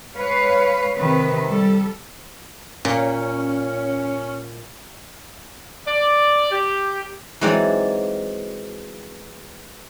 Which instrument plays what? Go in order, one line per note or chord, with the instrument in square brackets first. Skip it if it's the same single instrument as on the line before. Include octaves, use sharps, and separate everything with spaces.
[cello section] G#3 B4 C#5 F5
C3 D#3 B4
G3 A4
[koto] A#2 [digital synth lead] C#4
[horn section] D5
G4
[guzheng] E3 F#3 G#3 C4 D#4 D5